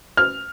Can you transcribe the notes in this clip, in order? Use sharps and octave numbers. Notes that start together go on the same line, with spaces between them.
F6